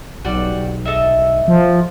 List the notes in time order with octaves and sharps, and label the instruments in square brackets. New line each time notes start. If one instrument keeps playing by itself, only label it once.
[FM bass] B1 [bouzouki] G3 F#4
[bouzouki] A4 D#5 E5
[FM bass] F3